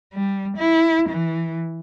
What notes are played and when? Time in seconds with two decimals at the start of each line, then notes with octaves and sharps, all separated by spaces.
0.14 G3
0.57 E4
1.09 E3